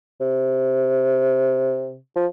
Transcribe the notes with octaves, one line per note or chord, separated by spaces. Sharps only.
C3
F3